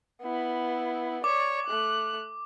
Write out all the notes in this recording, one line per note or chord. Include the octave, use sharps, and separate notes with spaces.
B3 E4
C#5 D5 D6
A3 F#6